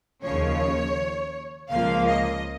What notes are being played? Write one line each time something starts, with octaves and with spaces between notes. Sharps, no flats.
D#2 C#3 F3 C#5
C#2 C#3 F3 A#3 F5
D#5